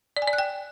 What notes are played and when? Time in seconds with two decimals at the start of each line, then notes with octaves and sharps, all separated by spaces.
0.17 D5
0.22 G#5
0.28 D5
0.33 F#6
0.38 G5